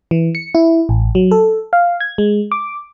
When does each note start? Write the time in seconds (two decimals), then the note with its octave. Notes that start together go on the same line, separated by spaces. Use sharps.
0.11 E3
0.35 C#7
0.55 E4
0.89 A1
1.15 F#3
1.31 A4
1.73 F5
2.00 G#6
2.18 G#3
2.52 D6